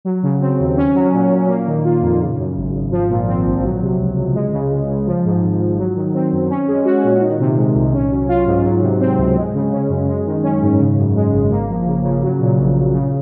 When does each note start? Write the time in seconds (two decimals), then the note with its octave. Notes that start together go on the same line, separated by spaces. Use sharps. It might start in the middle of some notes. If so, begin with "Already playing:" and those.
0.05 F#3
0.23 C#3
0.41 C4
0.60 D#2
0.77 C#4
0.95 F#3
1.13 A#2
1.30 A#2
1.48 A#3
1.67 D#3
1.85 F4
2.02 F2
2.20 C#3
2.38 F#2
2.56 G#1
2.74 G#1
2.92 F3
3.10 A#2
3.27 C4
3.46 A#1
3.64 F#3
3.81 C3
3.99 C#2
4.17 C#2
4.34 G#3
4.52 C#3
4.71 C#2
4.89 C#2
5.06 F3
5.25 G#2
5.42 G#1
5.59 G#1
5.77 F#3
5.96 D#3
6.14 C4
6.32 F#2
6.50 C#4
6.68 G#3
6.85 F#4
7.04 A#2
7.21 D#3
7.40 C3
7.57 G#3
7.75 C2
7.93 C#4
8.10 F#3
8.28 F4
8.46 G#2
8.65 F#3
8.82 C3
9.00 C4
9.18 C#2
9.36 G#3
9.54 C#3
9.72 C#4
9.89 F#2
10.08 G#3
10.26 D#3
10.43 C#4
10.62 G#2
10.79 C#3
10.98 F#2
11.15 G#3
11.32 G#1
11.50 A#3
11.69 F3
11.87 C#3
12.04 C#3
12.22 F#3
12.40 A#2
12.59 A#1
12.76 A#1
12.93 C#3